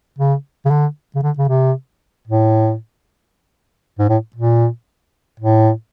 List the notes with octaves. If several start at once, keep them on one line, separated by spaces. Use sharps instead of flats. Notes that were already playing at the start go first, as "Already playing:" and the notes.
C#3
C#3
D3
C#3
D3
C#3
C3
A2
G#2
A2
A#2
A2